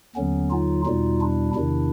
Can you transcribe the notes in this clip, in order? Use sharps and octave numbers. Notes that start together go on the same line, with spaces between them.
D#2 D3 F#3 B3 C#4
D#4 F4
E2 B2 G3 D#4 F4
D4 E4
E2 C3 D#3 D4 E4